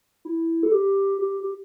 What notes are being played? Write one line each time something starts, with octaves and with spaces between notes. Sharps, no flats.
E4
A4
G4
G4
G4